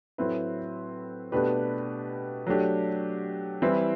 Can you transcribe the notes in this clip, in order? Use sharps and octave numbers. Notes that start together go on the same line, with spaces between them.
A2 F#3 C4 E4 B4
B2 A3 D4 G4 B4
F#3 A3 D4 G4
E3 G3 C4 E4 B4